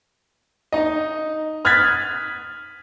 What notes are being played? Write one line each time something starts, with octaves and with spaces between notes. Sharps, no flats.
D#4 D#5
D#6 F6 F#6 G#6 A6 B6